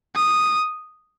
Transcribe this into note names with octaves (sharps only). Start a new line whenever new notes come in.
D#6